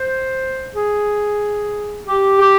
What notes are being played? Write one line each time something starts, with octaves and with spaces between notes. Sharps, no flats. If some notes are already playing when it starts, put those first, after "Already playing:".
Already playing: C5
G#4
G4
G4